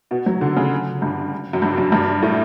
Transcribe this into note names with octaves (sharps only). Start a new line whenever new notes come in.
B2
F#3
D3
C#3
G2
F#2
G2
F#2
G2
A2